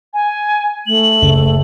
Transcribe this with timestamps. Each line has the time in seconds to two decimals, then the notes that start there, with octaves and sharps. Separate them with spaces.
0.14 G#5
0.87 A3 F#7
1.22 F#1